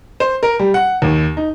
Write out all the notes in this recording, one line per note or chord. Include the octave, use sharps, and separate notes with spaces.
C5
A#4
G3
F#5
D#2
D#4